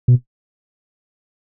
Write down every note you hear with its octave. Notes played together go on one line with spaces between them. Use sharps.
B2